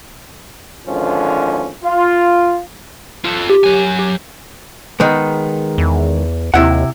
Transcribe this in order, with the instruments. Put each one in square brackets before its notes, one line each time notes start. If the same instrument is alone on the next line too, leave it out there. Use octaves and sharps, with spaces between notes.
[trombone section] G#1 D3 F3 C#4
F4
[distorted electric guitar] F4 A4
[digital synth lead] G4
[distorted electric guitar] F#3 G#5
[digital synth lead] G4
[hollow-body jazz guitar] D#3 G#3 B3
[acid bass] E2
[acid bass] D#2 [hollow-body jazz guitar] C3 E4 F#5